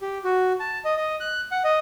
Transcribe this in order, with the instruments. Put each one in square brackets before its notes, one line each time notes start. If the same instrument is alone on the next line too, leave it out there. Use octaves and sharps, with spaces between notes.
[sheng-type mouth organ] G4
F#4
A5
D#5
D#5
F#6
F#5
D#5